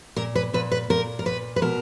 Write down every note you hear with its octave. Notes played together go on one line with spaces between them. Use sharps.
A#2 A#4
B4
A#2 B4
B4
A#2 A#4
A#4
A#2 B4
B4
B2 A#4